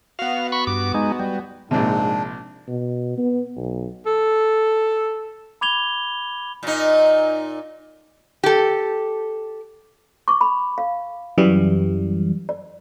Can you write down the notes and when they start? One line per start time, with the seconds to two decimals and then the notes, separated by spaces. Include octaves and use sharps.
0.19 B3 F#4 F5
0.52 B5 C#6
0.67 G2 D6
0.94 G#3 D#4
1.20 G3
1.71 A#1 G#2 C3 D4
2.68 B2
3.18 B3
3.57 B1
4.06 A4
5.61 B5 D6 G#6 F7 G7
6.63 A#2 D#4
8.43 G4 A4
10.28 C#6 D6
10.41 B5
10.78 F5
11.38 F#2 E3 G3
12.49 D5